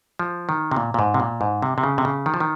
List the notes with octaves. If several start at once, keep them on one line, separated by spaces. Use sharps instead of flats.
F3
D#3
C3
A#2
A#2
G#2
C3
A#2
G#2
C3
C3
C#3
C3
C#3
D#3
F3
D#3